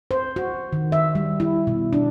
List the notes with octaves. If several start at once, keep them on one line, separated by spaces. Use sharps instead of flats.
C5
F#4
D#3
E5
G3
E4
B2
D4